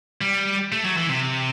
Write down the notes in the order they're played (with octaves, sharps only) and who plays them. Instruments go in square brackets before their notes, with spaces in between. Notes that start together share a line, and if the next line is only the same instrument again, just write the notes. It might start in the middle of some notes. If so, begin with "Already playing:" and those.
[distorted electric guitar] G3
A3
F#3
E3
C3